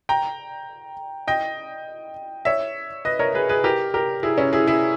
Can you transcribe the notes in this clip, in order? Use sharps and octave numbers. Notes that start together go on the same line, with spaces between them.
G5 A#5
D#5 G5
C#5 E5
B4 D#5
A#4 C#5
G#4 B4
G#4 B4
G4 A#4
G4 A#4
E4 G#4
C#4 E4
E4 G#4
E4 G#4